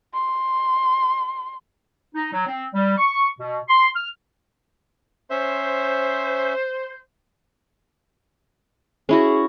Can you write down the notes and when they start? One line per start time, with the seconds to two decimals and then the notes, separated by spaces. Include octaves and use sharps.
0.14 C6
2.15 D#4
2.33 F#3
2.46 C4
2.73 G3
2.97 C#6
3.39 B2
3.68 C6
3.96 F6
5.31 C#4 C5 E5
9.09 C#4 E4 F#4 G#4